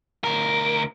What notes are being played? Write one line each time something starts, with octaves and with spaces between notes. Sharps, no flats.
D2 A#4